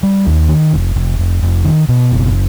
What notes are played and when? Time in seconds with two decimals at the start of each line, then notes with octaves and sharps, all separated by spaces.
0.03 G3
0.26 D#2
0.49 D#3
0.73 F1
0.96 F1
1.19 F1
1.42 F1
1.65 D#3
1.89 B2
2.12 F#1